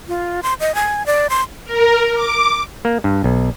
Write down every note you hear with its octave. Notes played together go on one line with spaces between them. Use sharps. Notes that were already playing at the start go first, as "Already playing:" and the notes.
F4
C6
D#5
G#5
D5
C6
A#4
D6
A#3
G2
B1